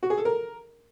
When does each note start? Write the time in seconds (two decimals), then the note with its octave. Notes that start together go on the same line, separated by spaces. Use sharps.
0.03 F#4
0.10 G#4
0.18 A4
0.25 A#4